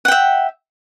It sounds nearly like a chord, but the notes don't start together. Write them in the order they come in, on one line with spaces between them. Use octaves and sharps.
F#5 G5 E5